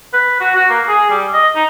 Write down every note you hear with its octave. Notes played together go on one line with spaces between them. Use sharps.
B4
F#4
F#4
A#3
G#4
G3
D#5
D#4